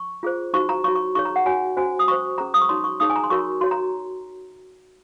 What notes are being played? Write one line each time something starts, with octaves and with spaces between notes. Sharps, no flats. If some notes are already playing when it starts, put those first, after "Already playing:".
Already playing: C#6
F4 G#4 C5
D#4 F#4 C5 C#6
A#5
F#4 C#5 C#6
C#6
D#4 G#4 C#5 C#6
A#5
F#5
F#4 C#5 G#5
C#4 F#4 C5 G#5
D#6
F#4 C5 C#6
C#4 G#4 C5 A#5
D#6
C#6
D#4 F#4 C#5 C6
C#6
D#4 G#4 C#5 D#6
G#5
A#5
C6
F#4 A#4 C#5 C#6
F#4 C#5 C6
A#5